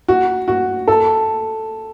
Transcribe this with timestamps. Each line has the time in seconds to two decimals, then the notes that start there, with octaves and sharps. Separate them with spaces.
0.08 F#4
0.48 F#4
0.88 A4